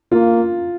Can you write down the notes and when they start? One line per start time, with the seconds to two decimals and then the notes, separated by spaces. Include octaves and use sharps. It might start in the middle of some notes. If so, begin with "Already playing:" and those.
0.12 A#3 F4